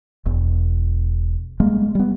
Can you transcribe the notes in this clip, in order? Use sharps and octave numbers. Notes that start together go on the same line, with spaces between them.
E1 E2
G3 G#3 A#3 B3
G3 B3